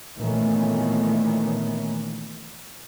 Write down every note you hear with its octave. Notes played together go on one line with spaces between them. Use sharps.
A#2 D#3 E3 A3 B3 C#4